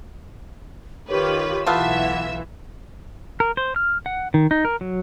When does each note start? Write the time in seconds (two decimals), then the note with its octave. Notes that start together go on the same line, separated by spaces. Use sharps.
1.09 D#3 F4 G4 B4 C#5
1.66 B1 E3 A3 B3 F4 E5 F#5 E6
3.40 A#4
3.57 C5
3.76 F6
4.06 F#5
4.34 D#3
4.51 D#4
4.65 A#4
4.81 F#3